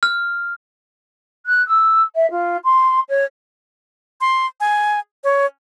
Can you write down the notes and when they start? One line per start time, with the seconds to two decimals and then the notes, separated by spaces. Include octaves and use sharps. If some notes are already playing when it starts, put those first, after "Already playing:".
0.03 F6
1.46 F#6
1.66 E6
2.15 E5
2.30 F4
2.64 C6
3.08 C#5
4.21 C6
4.60 G#5
5.24 C#5